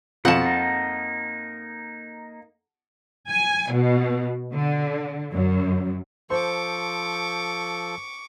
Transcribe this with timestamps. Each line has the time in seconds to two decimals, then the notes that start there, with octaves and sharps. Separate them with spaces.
0.25 F2 B2 F#5 A5
0.44 A#3 D#4
3.29 G#5
3.72 B2
4.54 D3
5.34 F#2
6.30 F3 A4 C5 C#6 D6